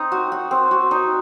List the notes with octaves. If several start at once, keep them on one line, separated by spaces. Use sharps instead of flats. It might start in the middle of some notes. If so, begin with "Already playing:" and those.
Already playing: C4 D#4
F#4
F#4
C4
F#4
D#4